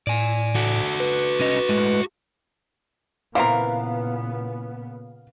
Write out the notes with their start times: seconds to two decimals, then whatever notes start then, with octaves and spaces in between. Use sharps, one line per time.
0.07 A2 D5 G#5
0.55 F#4 A4
1.00 B4
1.39 C2 C#4 D#5
1.69 A2 G#3
3.35 A#2 C#3 E3 B3 C4 A#4 F5